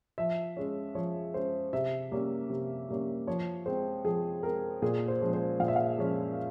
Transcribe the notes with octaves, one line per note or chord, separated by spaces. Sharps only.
F3 E5
G#3 C#4
F3 C#5
G#3 C#4 C5
C3 E5
G3 A#3 C#4
C3
G3 A#3 C#4
F3 C#5
G#3 C4 C5
F3 G#4
G#3 C4 A#4
A#2 G#4
C5
F3 G#3 C#4
C5
A#2 F5
E5
F5
F3 G#3 C#4